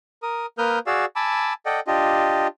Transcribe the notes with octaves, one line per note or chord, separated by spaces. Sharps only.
A#4 D#6
A#3 A#4 B4 D#6 F6 G6
F#4 G#4 D5 F5 E6
G#5 A5 B5 D6 E6
A4 D5 D#5 F#5 G5
D4 F4 G4 D#5